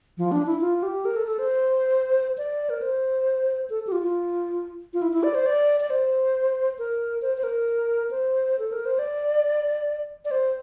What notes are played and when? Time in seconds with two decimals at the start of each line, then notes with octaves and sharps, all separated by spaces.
0.18 F3
0.32 D4
0.46 E4
0.61 F4
0.83 G4
1.05 A#4
1.16 A4
1.27 A4
1.39 C5
2.38 D5
2.70 A#4
2.82 C5
3.70 A4
3.87 G4
3.92 F4
4.03 F4
4.94 F4
5.02 E4
5.12 E4
5.23 D5
5.35 C5
5.46 D5
5.80 D5
5.90 C5
6.79 A#4
7.22 C5
7.37 C5
7.44 A#4
8.11 C5
8.59 A4
8.72 A#4
8.85 C5
8.99 D5
10.25 D5
10.31 C5